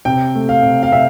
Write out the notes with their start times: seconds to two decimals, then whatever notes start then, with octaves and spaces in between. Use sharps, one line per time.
0.05 C3 G5
0.35 A3
0.49 F5
0.63 C3
0.83 F5
0.92 C3 E5